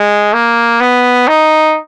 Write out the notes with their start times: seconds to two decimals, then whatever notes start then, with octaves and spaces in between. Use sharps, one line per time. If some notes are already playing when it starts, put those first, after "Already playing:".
Already playing: G#3
0.33 A#3
0.80 B3
1.28 D#4